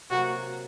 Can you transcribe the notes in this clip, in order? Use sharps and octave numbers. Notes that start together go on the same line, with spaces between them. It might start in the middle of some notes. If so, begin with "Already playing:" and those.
C3 F#3 A#3 F#4